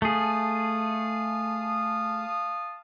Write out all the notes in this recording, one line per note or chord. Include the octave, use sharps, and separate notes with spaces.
A3 G#4 F5 A5 D#6